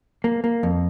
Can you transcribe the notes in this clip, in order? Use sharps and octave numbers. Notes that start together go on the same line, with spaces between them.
A#3
A#3
F2